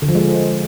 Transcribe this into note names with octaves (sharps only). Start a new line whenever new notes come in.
D3
F3
G#3